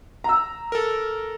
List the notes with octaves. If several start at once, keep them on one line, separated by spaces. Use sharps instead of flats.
A#5 E6
A4 A#4